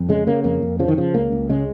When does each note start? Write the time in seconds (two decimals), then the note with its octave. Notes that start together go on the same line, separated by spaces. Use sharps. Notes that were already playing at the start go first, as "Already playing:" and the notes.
Already playing: F2
0.09 C#3 G#3
0.27 C#3 A#3
0.44 F2 A#3
0.62 F2
0.79 C#3 F3
0.88 D#3
0.97 C#3 F3
1.14 C#2 A#3
1.32 C#2
1.50 C#3 G#3